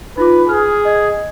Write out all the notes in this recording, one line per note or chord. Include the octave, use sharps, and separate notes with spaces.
D#4 F4 B4 D6
G#4 F6
D#5 G#6